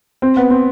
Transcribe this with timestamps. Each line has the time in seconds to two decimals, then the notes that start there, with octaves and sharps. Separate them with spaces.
0.22 C4
0.37 B3
0.50 C4